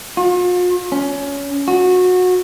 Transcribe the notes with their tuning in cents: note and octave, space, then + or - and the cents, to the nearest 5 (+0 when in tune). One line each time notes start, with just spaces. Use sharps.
F4 +45
C#4 +25
F#4 -20